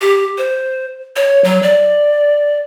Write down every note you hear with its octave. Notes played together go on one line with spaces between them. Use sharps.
G4
C5
C#5
F#3
D5